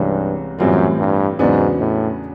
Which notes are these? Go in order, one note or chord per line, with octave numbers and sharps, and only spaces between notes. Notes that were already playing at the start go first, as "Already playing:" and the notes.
Already playing: C2 G2 C3 E3 G#3 C#4
F#2 A2 E3 G3 C4 F4
G2
E2 G#2 C#3 F#3 B3 D4
A2